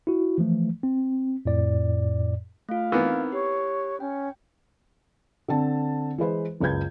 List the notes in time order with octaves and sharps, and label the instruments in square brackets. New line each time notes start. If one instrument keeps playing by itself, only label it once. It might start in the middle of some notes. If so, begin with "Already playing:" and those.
[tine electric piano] E4 F#4
E3 F3 A3
C4
F2 A2 D5
[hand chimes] A3 F4 [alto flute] F5
[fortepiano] E3 B3 [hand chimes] C4 D#4 A#4
[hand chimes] G4 [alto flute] C#5
[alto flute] C#4 [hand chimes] G5
[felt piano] D3 C4 A5
E3 G#3 B4 C5
F#1 C#2 G#4 B4 G6 G#6